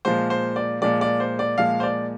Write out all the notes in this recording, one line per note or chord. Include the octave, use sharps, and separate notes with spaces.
A#2 F3 G#3 C5
C5
D5
A#2 F3 G#3 D5
D5
C5
D5
A#2 F3 G#3 F5
C5
D5